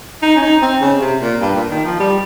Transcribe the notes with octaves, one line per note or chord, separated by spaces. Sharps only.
D#4
C#4
D#4
C4
C#3
C3
A#2
G2
A#2
D#3
F3
G3